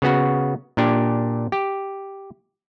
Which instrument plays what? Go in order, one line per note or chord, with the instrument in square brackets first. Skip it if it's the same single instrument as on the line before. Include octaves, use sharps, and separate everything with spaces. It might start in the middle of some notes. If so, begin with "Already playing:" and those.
[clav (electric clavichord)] C#3 B3 F#4
A#2 D4 G4
G4